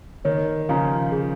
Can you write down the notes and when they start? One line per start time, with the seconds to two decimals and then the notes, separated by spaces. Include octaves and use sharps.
0.25 D#3 C#5
0.69 C#3 F3 F5 A#5
1.12 G#4